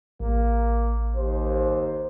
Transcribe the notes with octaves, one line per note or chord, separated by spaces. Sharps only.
A1 A#3
D#2 C5